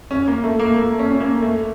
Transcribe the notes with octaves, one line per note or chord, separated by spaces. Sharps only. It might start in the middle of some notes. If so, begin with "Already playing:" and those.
C#4
A#3
A3
A#3
A#3
C#4
C#4
A#3
A3